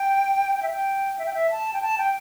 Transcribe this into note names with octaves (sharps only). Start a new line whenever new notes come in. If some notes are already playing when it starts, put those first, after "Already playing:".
Already playing: G5
G5
E5
G5
E5
G5
E5
A5
G5
A5
G5